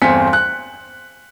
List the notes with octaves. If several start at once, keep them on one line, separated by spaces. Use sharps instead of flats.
G1 E2 C4 G#5 B6 C#7
F#6